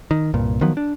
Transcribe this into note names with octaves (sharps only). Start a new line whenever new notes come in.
D#3
C2 G2 A#2
D#3 F3 F#3 B3
D4